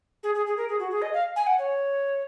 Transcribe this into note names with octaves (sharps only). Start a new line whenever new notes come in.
G#4
G#4
G#4
A#4
G#4
F#4
G#4
D#5
F5
G#5
F#5
C#5